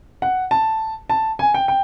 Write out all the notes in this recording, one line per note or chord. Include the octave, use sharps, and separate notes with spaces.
F#5
A5
A5
G#5
G5
G5